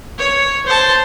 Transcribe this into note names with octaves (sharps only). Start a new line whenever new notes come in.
C#5
C5 A5